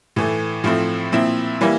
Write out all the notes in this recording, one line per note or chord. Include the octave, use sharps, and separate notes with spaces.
A2 E3 A3
A2 F3 A3 C4 E4
A#2 F3 C4 E4
E3 G3 A#3 E4